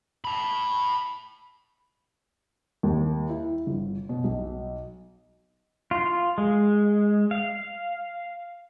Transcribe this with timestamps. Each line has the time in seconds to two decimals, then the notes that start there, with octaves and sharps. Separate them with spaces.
0.25 A5 B5
2.83 D#2
3.29 E4
3.67 G1
4.09 B2
4.24 B1
5.91 F4
6.38 G#3
7.31 F5